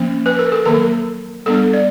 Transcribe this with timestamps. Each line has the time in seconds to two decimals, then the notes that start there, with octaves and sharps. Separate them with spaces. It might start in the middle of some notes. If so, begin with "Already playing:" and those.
Already playing: F3 A#3 C#4
0.26 B4
0.39 A#4
0.52 A4
0.65 D#3 F#3 A#3 A#4
1.46 G3 B3 D4 A4
1.73 D5